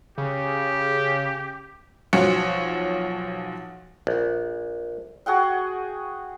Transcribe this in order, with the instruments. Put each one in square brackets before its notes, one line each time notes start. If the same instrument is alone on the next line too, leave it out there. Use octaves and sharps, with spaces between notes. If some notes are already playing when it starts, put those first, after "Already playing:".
[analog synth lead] C#3 [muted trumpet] G4
[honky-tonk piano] B1 F3 F#4 C#5 C#7
[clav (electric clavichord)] A#1
[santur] F#4 G#4 F#5 G5